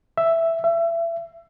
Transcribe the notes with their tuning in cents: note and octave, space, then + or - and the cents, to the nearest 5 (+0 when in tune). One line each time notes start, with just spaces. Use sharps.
E5 +5
E5 +30